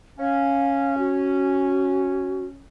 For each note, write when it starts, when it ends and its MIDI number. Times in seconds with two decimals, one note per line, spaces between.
0.19 2.64 61
0.19 0.95 77
0.98 2.45 66